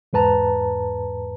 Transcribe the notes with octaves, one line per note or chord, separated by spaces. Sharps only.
E2 G#2 B4 A5 A#5